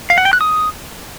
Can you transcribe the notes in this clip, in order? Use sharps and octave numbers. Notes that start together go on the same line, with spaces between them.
F5
F#5
G5
F#6
D#6